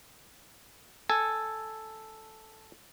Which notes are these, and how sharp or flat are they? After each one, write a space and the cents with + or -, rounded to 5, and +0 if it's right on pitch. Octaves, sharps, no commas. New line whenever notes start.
A4 +0 G#5 +0